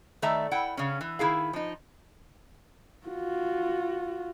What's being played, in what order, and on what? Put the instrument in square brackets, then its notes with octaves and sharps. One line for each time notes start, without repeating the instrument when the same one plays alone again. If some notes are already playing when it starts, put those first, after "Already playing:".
[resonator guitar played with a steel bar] D#3 A3 D5 E5 A#5
E4 F#5 G5
C#3 C#4
E3
D#3 E4 G#4 F5
F3 D#4
[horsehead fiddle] F4 F#4